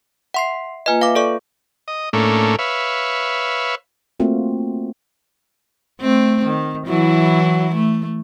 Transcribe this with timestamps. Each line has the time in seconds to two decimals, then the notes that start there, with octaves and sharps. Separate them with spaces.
0.34 E5 F#5 C6 C7
0.86 A#3 F4 B4 D#5 G#5
1.01 B4 E5 F5 D6
1.15 A4 D5 C#6
1.88 D#5
2.13 A2 A3 A#3 C#4 D4
2.59 B4 C#5 E5 F5
4.20 A3 A#3 C4 F4 F#4
6.01 A3 C4
6.45 D#3
6.87 E3 F#3 E4
7.74 A3